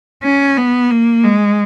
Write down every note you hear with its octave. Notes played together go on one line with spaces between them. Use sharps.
C#4
B3
A#3
G#3